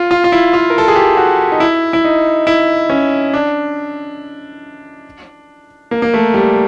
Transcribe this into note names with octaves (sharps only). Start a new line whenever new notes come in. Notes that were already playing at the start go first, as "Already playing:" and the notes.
Already playing: F4
F4
F4
E4
F4
A#4
A4
G#4
G4
F#4
D#4
E4
E4
D#4
E4
C#4
D4
A#3
A#3
A3
G3